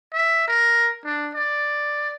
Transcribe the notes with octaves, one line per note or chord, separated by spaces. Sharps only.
E5
A#4
D4
D5